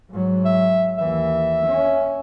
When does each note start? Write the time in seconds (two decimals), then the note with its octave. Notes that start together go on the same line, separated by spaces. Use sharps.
0.10 G#2 F#3
0.45 E5
0.98 D#2 E3 E5
1.65 C#4